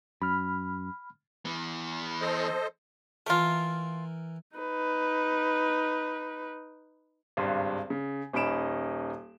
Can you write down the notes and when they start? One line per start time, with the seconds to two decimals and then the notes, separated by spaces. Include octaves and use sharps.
0.22 F#2 B5 F6
1.45 E3 B3
2.21 A4 C5 D#5
3.26 E3 A3 F4 A#4
4.57 D#4 B4
7.37 G#1 C#2 G2 C6
7.90 C#3
8.33 D#1 C#4 D#4 B5 D7 E7